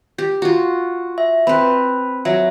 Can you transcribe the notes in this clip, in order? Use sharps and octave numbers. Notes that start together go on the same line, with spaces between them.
G4
F4 F#4
E5
C4 B4 B5
F#3 E5